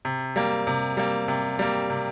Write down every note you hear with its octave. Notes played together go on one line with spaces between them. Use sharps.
C3
G3 A#3
C3
G3 A#3
C3
G3 A#3
C3